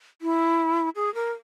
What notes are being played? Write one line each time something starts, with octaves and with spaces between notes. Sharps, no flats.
E4
G#4
A#4